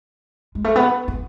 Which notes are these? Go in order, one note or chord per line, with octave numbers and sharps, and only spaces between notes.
G#3
A3
B3
B3